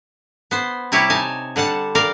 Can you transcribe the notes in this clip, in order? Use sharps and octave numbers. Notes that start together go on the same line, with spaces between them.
B3 C5
C3 G3 E4 G4 C#5
D#4 G#5 A5
D3 G3 F#5 A5
A#4 D5 F5 G5